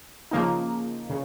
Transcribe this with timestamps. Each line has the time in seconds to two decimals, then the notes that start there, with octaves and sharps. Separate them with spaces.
0.31 C#3 F3 A#3 D#4
1.10 C#3